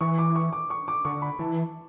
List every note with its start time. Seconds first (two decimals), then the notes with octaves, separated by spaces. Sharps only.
0.01 E3 C#6
0.18 D6
0.36 C#6
0.53 D6
0.70 C#6
0.88 D6
1.05 D3 C#6
1.22 B5
1.39 E3 A5